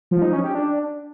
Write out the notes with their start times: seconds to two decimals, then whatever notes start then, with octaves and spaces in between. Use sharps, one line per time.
0.11 F3
0.22 D#4
0.33 C#4
0.44 G4
0.55 D4